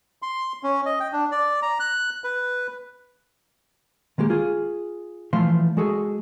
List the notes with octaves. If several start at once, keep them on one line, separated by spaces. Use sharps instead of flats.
C6
C#4
D#5
G5
D4
D5
A#5
F#6
B4
D#3 G#3 A#3 G4
F4 G#4
E3 F3 A3 F5 C6
G#3 F#4 G#4 A4